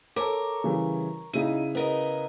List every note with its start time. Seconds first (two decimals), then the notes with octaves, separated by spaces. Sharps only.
0.16 A4 A#4 C#5 D6
0.64 C#3 E3 G3
1.33 C#3 D#4 E4 D#7
1.75 B3 A#4 D#5